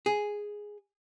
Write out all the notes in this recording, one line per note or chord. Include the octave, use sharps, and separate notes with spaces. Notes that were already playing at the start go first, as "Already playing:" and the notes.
G#4